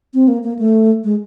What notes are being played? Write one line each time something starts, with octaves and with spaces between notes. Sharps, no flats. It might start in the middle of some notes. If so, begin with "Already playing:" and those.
C4
A#3
A#3
A3
G#3